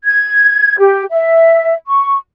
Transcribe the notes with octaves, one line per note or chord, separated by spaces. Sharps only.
G#6
G4
E5
C#6